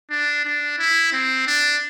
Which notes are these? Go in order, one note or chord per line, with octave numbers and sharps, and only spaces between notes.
D4
D4
E4
C4
D4